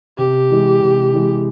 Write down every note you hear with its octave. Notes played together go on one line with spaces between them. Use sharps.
C3 G4
E3 G#3
C3
E3 G#3